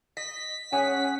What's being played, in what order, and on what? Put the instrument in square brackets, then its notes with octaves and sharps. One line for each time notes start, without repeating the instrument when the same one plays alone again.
[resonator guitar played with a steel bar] D#5 [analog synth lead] B6
[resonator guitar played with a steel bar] G#2 G#4 G#5 [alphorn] C#4 [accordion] F#5